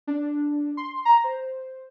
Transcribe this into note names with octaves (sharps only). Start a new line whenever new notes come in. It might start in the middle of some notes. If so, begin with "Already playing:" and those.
D4
C6
A#5
C5